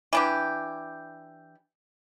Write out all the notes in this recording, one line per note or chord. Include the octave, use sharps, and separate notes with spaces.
E3 D4 G4